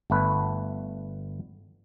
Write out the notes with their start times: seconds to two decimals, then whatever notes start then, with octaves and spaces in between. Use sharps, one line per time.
0.10 G1 A3 B4